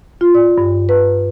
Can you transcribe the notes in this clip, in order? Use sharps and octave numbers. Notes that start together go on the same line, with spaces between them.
F4
D5
G2
B4